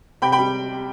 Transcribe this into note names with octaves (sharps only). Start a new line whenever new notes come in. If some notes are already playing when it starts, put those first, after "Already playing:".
C3 G5 B5
G5 B5
G3